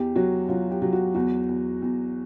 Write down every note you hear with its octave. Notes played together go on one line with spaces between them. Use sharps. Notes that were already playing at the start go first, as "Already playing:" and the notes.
Already playing: E2 G4
F#3 F#4
F#3 F4
G4
F#3
F#4
E2 F#4
E2
E2